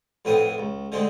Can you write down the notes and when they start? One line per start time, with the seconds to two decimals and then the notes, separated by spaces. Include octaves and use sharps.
0.25 F2 A2 B3 C4 D#6
0.58 C#2
0.92 D3 G#3 A3 C4